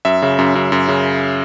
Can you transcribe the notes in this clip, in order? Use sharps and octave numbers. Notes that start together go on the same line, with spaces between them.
F#2 E5
C#3
F#2
F#2
F#2
C#3